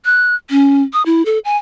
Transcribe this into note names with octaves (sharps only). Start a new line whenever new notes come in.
F#6
C#4
D#6
E4
A4
G#5